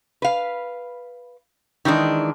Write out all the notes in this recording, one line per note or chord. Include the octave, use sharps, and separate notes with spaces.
B4 F5
D#3 E3 G#3 D4